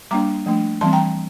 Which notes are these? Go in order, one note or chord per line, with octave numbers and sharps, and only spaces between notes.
G3 A#3 D4 A#5 D6
F3 A3 D4
E3 G3 C4 A5 C6
G5 A#5